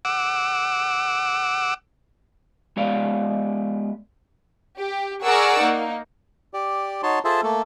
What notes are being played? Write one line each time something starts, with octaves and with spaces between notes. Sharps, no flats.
F#5 D6 E6
G#3 B3 G4 D5 F5
G4
G#4 A#4 D5 F#5 C#6 E6
A#3 D#4
G4 D5
D#4 F#4 C#5 A5 C6
F4 G#4 A4 C5 E5 A5
A3 A#3 A4